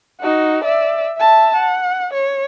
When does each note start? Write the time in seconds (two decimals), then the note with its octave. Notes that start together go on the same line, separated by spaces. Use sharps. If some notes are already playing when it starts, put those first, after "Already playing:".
0.20 D#4 F#4
0.64 D5 E5
1.18 E5 A5
1.56 F#5
2.13 C#5